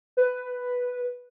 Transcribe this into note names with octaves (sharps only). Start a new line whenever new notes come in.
B4